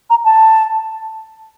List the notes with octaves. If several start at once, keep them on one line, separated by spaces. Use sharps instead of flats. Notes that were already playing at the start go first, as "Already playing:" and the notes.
A#5
A5